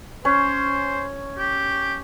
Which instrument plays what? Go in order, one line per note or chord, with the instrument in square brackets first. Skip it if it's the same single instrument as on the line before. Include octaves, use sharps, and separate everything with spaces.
[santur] C#4 [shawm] C5
[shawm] G4